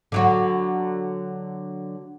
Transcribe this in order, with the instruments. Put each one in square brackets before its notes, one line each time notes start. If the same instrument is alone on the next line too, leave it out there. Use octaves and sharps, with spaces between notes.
[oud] D3 F#3 F#4